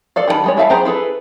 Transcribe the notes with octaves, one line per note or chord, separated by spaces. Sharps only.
A4 D5 F5
D#3 G3 F#4 A5 B5
G3 G#3 C#5
G#3 E4 E5 F5 A5
F#3 G4 G#4 C5 A#5
E4 G#4 A4 B4